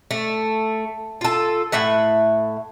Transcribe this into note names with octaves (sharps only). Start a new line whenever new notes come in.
A3
F4 A4
A2 A3 E5 F#5